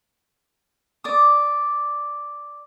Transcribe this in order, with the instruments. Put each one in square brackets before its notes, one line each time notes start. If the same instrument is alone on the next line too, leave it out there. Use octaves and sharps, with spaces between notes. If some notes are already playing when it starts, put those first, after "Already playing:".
[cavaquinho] D5 D#6